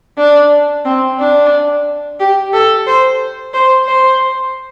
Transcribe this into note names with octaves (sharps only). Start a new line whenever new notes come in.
D4
C4
D4
G4
A4
C5
C5
C5